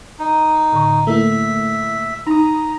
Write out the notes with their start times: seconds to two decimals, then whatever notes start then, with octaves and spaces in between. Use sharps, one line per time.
0.19 D#4
0.72 A2 D3 C#6
1.07 A3 A#3 E4 E5
2.27 D#4 A#5 B5 D#6